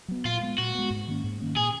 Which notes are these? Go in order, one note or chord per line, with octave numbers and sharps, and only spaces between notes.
F#3 B3
A#2 F4
G#3 B3
A#2 F#4
G#3 B3
G#2
D#3 A#3 C#4
G#2
D#3 A#3 C#4
A#2 G#4